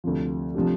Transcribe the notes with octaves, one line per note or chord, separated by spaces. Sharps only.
D2 C3 F3
C3 F3 A3 D4 G4